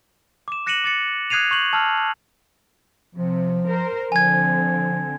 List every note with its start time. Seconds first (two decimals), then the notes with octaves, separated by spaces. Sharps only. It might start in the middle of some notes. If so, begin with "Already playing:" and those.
0.48 D6 E7
0.67 F#6 A#6 C#7 D#7 E7 F#7
0.84 D6 A6 C#7
1.30 D#6 F#6 G#6 C7 D#7 F7
1.51 C#6 G6 F#7
1.73 A5 E6 F6
3.15 C3 F3
3.67 A#4 C5
4.12 D3 F3 C4 G#5 G#6